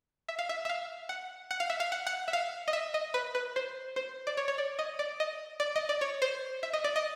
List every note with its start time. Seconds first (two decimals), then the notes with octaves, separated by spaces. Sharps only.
0.28 E5
0.39 F5
0.49 E5
0.65 E5
0.69 F5
1.09 F#5
1.51 F#5
1.60 F5
1.70 E5
1.80 F5
1.92 F#5
2.06 F#5
2.28 E5
2.33 F5
2.68 D#5
2.73 E5
2.94 D#5
3.14 B4
3.35 B4
3.56 C5
3.96 C5
4.27 D5
4.37 C#5
4.48 C#5
4.58 D5
4.79 D#5
4.99 D5
5.20 D#5
5.60 D5
5.76 D#5
5.89 D5
6.01 C#5
6.22 C5
6.63 E5
6.73 D#5
6.84 D5
6.96 D#5